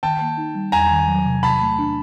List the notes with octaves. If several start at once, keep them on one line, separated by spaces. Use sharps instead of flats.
D#3 G5 A5
A#3
D#4
G3
E2 G#5 A#5
D#3
F#3
C3
C3 A5 B5
A3
D4